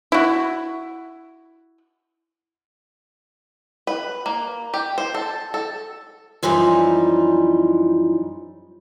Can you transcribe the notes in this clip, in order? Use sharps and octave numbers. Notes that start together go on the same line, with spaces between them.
E4 F#4
B4
A#3
G4
C5
A4
A4
F#2 E3 F3 G3 D#4